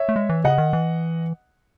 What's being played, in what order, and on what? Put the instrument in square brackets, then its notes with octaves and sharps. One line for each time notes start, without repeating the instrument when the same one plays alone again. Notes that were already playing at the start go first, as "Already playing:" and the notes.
Already playing: [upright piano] C#5 E5
[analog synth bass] A3
G#3
E3
[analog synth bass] C#3 [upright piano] D#5 F#5
[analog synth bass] D#3
E3